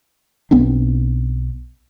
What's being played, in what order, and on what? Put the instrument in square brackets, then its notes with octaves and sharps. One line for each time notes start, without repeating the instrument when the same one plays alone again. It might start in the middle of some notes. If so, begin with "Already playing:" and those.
[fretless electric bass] B1 B3 C4 D4